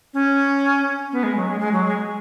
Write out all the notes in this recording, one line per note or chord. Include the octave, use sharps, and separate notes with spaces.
C#4
B3
G#3
F#3
G#3
G#3
F#3
G#3